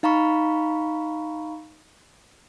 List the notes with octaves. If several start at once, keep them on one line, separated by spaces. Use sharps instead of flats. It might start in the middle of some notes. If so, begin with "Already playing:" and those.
D#4 F5 A#5 B5 C#6